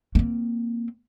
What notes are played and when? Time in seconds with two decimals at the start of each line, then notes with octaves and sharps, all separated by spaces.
0.15 A#3 C4